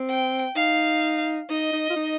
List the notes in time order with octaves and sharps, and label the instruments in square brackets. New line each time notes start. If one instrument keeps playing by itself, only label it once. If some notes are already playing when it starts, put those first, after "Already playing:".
Already playing: [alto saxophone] C4
[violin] G5
[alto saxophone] D#4 [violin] F5
[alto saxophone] D#4 [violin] D#5
[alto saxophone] D#4
F4
D#4